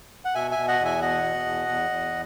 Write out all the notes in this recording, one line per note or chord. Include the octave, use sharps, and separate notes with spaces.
F#5
B2 E5 G#5
E5 G#5
B2
D#5 F#5
E2
E5 G#5
B2 D#5 F#5
B2
E2
E2
E2